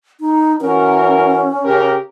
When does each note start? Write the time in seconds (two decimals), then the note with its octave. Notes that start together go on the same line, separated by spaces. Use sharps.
0.20 D#4
0.61 E3 C#4 F#4 A#4
1.64 C#3 G4 A#4